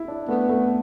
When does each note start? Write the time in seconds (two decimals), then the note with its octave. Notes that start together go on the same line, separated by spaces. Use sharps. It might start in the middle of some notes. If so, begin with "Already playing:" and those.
Already playing: E4
0.08 D4
0.28 A3 B3
0.49 A3